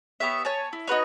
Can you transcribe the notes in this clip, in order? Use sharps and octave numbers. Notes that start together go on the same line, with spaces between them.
B3 G4 C#5 E5
C#5 G#5 A5
E4
D#4 F#4 B4 C#5